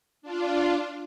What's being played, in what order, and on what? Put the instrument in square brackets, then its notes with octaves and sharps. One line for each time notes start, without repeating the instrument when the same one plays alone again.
[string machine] D4 F4